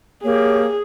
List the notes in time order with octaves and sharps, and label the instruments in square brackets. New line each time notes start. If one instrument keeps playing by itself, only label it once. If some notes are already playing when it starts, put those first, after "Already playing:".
[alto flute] A#3 [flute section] G4 C#5 [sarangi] G#4